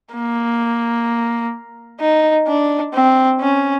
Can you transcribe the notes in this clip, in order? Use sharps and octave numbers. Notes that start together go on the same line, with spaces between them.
A#3
D#4
D4
C4
C#4